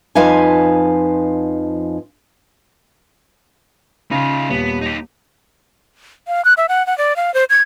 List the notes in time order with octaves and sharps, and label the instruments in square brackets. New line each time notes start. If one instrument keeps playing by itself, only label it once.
[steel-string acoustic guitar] F2 F3 D#4 B4 F5 G#5
[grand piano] C#3 [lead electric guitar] D#4 F4
[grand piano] D#1 [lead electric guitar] B3
[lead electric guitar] D#4 G4
[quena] F5
F#6
E5
F#5
F#5
D5
F5
C5
G#6